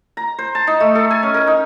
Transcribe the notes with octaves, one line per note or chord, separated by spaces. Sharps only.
A#5
C5
A5
D#4
A3
A4
G#5
C#4
A#4
D#4